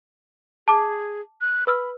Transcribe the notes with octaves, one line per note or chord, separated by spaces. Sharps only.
G#4 A5 D6
F#6
B4 B5 E6 F6